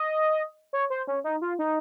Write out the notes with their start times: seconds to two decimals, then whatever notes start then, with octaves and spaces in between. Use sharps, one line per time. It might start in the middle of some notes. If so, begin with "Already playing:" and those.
Already playing: D#5
0.73 C#5
0.90 C5
1.07 C#4
1.24 D#4
1.41 F4
1.59 D#4